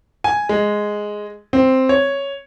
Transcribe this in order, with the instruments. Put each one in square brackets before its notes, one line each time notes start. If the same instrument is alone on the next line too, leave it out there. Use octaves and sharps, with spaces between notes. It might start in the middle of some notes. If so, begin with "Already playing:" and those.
[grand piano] G#5
G#3
C4
C#5